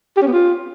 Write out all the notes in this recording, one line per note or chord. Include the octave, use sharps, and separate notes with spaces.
G4
C#4
B3
F4